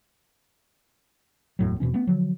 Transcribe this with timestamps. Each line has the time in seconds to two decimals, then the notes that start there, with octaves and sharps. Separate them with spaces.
1.59 F#1 E2 A2 F#3
1.80 E2 B2 E3 C#4
1.93 A3 B3 C#4
2.07 D3 F3 F#3